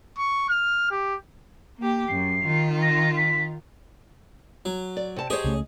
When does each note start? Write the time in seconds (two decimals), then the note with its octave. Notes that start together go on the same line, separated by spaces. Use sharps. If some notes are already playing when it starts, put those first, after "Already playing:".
0.18 C#6
0.49 F6
0.91 G4
1.78 A#3 G4
2.08 F#2 C7
2.44 D#3 F4
2.82 A#6
3.17 B6
4.65 F#3
4.97 D5
5.16 C3 A5
5.30 G4 G#4 C5 C#5 D#5
5.44 C#2 C#3 A3